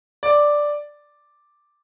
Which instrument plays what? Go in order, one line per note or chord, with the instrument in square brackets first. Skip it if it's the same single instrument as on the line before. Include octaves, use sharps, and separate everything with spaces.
[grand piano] D5